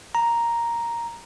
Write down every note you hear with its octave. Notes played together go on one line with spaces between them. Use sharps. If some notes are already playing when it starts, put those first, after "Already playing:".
A#5